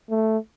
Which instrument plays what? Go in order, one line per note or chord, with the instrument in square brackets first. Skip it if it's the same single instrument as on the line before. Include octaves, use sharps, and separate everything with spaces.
[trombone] A3